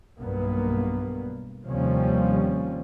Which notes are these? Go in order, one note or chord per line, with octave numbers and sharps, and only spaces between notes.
B1 G2 A#3 B3
D#2 C3 F3 G3 C#4